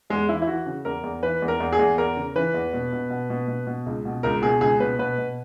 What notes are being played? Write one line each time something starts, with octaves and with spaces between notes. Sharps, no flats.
E2 G#3
E3 E4
E4
E3 F#4
C#3
E2 A#4
E2
E3 B4
E2
A#4
E2
G#4
E2
E2 A#4
C#3
E3 B4
E2
B2
B2
B2
B2
B2
B2
C#2
B2
C#2 A#4
B2 G#4
C#2 G#4
B2 B4
B2 B4
B2